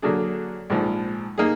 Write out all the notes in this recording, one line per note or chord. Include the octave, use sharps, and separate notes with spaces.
D3 F#3 A#3 D4 G#4
A#1 G#2 F3
A#3 D#4 G#4